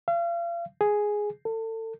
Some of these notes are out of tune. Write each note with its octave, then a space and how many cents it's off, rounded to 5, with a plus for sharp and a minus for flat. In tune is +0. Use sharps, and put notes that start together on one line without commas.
F5 -35
G#4 +5
A4 +30